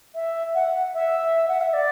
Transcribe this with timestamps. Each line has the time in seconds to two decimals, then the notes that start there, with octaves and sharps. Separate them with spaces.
0.15 E5
0.55 F#5
0.94 E5
1.48 F#5
1.61 E5
1.73 D5